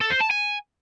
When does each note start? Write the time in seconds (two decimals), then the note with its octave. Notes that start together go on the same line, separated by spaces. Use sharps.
0.01 A4
0.11 C5
0.21 A5
0.31 G#5